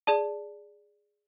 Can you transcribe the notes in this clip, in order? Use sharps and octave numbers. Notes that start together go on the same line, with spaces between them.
G#4 D5 A5